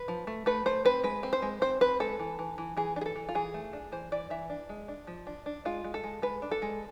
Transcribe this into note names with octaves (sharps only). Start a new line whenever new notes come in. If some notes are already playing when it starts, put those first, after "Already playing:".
Already playing: B4
F3
A3
A3 B4
A3 C5
C4 B4
G#3 B4
C4
C5
G#3
C4 C5
C4 B4
G#3 A4
E3
E3
E3
E3 G#4
D4
G#4
A4
E3
F4
E3 G#4
A3
D4
E3 C5
E3 D5
E3 E5
D4
G#3
D4
F3
D4
D4
G#3 F4
G#3
A4
G#3
G#3 B4
D4
A4
G#3